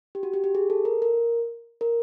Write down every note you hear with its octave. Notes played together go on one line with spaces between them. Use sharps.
G4
F#4
G4
G4
G#4
A4
A#4
A#4
A#4